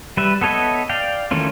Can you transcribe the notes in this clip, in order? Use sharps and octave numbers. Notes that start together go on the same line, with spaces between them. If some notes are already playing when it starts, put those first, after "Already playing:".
G3 B4 E5
B3 A4 C#5 D#5 E5
D5 F5 G5
D#3 E3 A3 C#4 F4